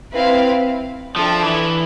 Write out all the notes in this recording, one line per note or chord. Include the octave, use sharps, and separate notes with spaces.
C4 E4 B4 F5
F3 D4 A4 E5 G5
E3